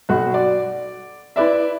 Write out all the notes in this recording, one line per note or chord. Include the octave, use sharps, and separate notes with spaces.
B1 F#4
D5
E4 B4 D5 E5